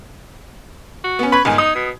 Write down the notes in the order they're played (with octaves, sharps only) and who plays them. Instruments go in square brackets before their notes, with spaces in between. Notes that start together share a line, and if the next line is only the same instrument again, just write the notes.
[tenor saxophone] F#4
[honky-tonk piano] B3 C#4
[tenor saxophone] B4 [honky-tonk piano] B5 C#6 G#6
[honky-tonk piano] G1 G#2 G#5 [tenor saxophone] D#3
[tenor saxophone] D#4 [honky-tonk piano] D#6
[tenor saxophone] B2